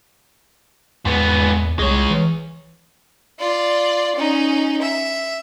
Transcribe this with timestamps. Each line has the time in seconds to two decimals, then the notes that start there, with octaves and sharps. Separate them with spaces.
1.05 E2 G#2 B3
1.79 C2 G#3 C#5
2.10 E3
3.39 F4 D5
4.16 C#4 D#4
4.82 E5